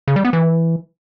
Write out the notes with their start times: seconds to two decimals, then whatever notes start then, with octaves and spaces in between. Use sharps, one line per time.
0.08 C#3
0.16 G3
0.25 B3
0.33 E3